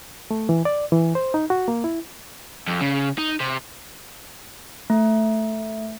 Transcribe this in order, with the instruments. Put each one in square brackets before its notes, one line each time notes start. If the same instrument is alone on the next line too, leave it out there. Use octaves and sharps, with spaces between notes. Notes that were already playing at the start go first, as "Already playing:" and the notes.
[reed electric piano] A3
E3
D5
E3
C5
D#4
F#4
A#3
E4
[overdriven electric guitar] F2
C#3
D#4
C3
[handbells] A3